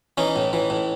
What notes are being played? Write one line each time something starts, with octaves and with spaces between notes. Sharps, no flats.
E3 C#4 D#4
A2
E3
A2